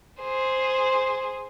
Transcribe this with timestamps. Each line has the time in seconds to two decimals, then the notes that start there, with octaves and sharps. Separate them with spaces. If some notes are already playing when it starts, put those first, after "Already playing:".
0.21 G#4 C5